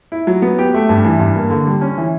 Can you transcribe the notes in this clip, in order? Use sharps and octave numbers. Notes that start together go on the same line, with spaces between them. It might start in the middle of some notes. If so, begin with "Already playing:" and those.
E4
F#3
B3
G4
A3
G2
E3
G2
A#3
D3
G3
C#4
E3